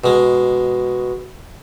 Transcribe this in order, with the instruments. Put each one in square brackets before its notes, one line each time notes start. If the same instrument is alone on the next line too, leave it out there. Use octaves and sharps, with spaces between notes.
[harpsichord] B2 G#3